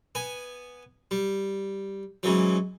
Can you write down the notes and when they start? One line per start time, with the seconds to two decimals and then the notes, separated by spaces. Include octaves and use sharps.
0.15 B3 G#5
1.11 G3
2.23 G#2 C#3 E3 F#3